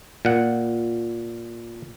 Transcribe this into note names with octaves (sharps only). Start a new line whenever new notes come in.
A#2 F#5